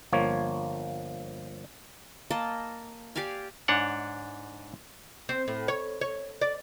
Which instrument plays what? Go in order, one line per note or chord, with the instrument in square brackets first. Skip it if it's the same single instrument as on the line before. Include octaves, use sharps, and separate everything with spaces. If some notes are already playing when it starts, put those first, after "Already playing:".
[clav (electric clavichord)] G1 F3 A#3 C#5
[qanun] A#3 D#5 A5
G4 D5 F5 G#5
[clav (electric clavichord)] G#2 D4 C#5 F#5
[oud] C4
A2
C#5
C#5
D5